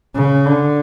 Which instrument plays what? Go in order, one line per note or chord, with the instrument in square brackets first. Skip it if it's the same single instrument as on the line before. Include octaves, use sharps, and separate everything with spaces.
[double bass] C#3
D3